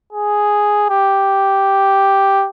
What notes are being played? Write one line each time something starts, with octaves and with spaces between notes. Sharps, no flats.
G#4
G4